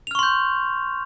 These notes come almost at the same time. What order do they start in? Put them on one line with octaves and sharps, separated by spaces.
F7 F6 C#6 C6 G6